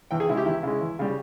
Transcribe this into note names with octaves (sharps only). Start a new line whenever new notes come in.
E2 G5
G#4
C#3 G#3 E4
G4
E2 E4
C#3 G#3
E2
C#3 G3